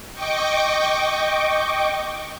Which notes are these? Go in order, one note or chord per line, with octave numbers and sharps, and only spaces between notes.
D#5 G5 C#6 D6